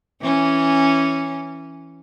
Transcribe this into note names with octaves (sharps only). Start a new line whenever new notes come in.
E3 C#4